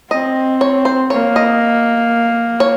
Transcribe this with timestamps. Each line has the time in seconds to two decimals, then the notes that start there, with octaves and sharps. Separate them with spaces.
0.11 C4 D#5
0.61 C#5
0.85 C5
1.10 A#3 C#5
1.36 D#5
2.60 C#5